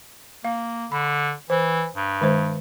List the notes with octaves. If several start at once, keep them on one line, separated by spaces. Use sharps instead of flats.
A#3 F5
D3 B5
E3 C5
G2
D#3 G#3 C5